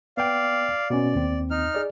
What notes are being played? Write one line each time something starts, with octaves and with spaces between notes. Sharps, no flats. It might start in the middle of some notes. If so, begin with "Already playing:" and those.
B3 D5 F5 G5
B2 B3 C#4 D5
D#2 C4
D#4 F6
G#4 D5